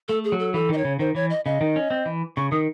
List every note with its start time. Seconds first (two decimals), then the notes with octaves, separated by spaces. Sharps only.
0.08 A3 A4
0.24 G#4
0.32 F#3
0.39 A4
0.54 E3 A4
0.69 D#3 D#5
0.78 C#5
0.85 C#3
0.99 D#3 C5
1.15 E3 C#5
1.30 D#5
1.45 C#3 D#5
1.61 D#3
1.76 C#4
1.91 C4
2.06 E3
2.37 C#3 C#6
2.51 D#3 D#6